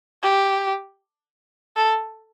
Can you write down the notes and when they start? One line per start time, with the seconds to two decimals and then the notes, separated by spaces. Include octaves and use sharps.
0.23 G4
1.76 A4